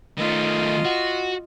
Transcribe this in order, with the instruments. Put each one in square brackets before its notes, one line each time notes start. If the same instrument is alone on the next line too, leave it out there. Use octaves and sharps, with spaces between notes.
[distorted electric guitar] D#3 A3 [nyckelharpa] F4 D#5
[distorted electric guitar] F#4